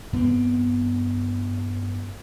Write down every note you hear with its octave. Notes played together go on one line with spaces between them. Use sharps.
G2 B3 C4